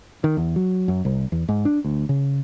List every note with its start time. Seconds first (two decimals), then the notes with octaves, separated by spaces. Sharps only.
0.24 D#3
0.37 E2
0.56 F#3
0.88 F#2
1.05 C2
1.32 E2
1.49 G#2
1.65 D4
1.84 D2
2.09 C#3